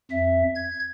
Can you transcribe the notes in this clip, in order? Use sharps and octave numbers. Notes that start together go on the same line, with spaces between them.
F2 E5
G#6